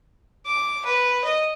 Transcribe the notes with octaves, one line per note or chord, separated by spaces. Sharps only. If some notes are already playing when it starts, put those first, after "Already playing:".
D6
B4
D#5